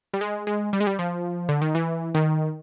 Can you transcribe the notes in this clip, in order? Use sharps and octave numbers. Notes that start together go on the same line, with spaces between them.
G3
G#3
G#3
G3
G#3
G3
F3
D3
D#3
E3
D#3